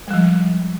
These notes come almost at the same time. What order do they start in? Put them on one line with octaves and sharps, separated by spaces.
G#3 G3 F3